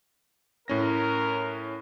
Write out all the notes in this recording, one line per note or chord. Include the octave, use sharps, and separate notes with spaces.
A2 C#4 A#4 A#6